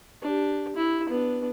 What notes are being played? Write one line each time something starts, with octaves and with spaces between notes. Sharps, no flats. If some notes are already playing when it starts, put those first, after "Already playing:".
D4 G4
E4
B3 D4